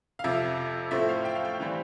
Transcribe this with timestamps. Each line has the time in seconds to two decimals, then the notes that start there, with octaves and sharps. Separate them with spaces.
0.19 F5
0.24 F2 C3 F3 E5
0.91 A2 F3 A3 C4 E5
1.09 F5
1.25 G5
1.35 F5
1.45 G5
1.60 E3 G3 C4